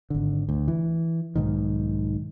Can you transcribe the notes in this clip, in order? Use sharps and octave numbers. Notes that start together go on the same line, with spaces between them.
G#1 D3
D2
E3
B1 G#2 D#3